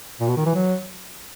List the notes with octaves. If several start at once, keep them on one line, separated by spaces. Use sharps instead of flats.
A#2
B2
D#3
E3
F#3